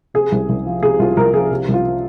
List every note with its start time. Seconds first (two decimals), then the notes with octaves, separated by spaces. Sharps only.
0.14 C3 G#4
0.32 C2
0.49 C2
0.66 F3
0.83 C3 G#4
0.99 C2 F4
1.17 C2 A#4
1.34 F3 G#4
1.51 C3
1.68 C2
1.74 F4